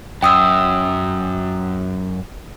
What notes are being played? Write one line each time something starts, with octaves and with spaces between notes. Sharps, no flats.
F#2 G5 D#6 E6